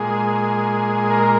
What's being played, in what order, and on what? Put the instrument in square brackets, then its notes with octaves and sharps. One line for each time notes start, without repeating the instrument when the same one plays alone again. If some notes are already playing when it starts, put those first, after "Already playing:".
Already playing: [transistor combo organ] A#2 G#3 G#4
A#4